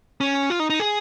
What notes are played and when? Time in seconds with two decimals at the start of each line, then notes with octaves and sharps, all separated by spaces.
0.21 C#4
0.50 F4
0.60 D#4
0.70 D#4
0.80 G#4